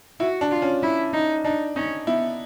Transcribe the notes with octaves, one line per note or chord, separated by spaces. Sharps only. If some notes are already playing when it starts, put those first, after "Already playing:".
E4 F#4
D4
F4
C#4
E4
D#4
D4 D#4
C#4 D#4
B3 E4